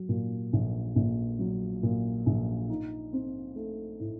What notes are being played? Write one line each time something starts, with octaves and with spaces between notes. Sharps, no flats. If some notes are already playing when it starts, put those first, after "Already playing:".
Already playing: F#3
A#2
A#1
A#1
F#3
A#2
A#1
D#4
C4
A3
A2